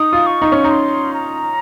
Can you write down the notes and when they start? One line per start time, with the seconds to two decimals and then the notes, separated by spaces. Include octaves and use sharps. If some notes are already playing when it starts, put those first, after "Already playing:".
Already playing: D#4 D#6
0.13 F4
0.27 C#6
0.42 D#4
0.52 C#4
0.64 D#4
0.70 C6
1.14 A#5